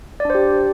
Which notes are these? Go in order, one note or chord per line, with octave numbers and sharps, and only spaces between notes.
D4 G4 C5 D5